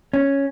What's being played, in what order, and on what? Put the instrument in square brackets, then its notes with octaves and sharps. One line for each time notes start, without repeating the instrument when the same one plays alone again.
[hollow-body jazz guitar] C#4